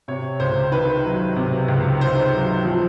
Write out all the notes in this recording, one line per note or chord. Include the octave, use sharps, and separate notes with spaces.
C3 C#5
C#2 C5
D#3 B4
F#3
C3
C#2
D#3 C5
F#3
F3